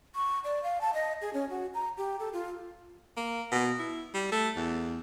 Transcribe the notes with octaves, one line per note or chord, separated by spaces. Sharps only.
C#6
D5
F5
A5
D#5
G#4
C#4
F#4
A#5
G4
A4
F4
A#3
B2
E4
G3
A3
E2